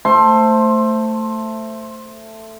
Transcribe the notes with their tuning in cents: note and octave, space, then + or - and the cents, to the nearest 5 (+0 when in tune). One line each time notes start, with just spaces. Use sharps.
A3 +10 C5 +0 C6 +20